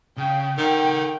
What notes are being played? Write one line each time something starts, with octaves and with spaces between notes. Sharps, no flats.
C#3 G5
D#3 A4 F#5 G5